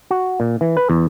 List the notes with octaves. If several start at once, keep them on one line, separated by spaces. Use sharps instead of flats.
F#4
A#2
E3
B4
E2